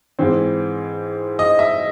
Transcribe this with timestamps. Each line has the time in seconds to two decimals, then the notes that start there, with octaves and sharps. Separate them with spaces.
0.19 G#2 E3 C4
1.39 D#5
1.59 E5